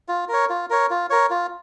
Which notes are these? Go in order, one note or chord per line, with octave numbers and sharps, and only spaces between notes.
F4
A#4 C#5
F4
A#4 C#5
F4
A#4 C#5
F4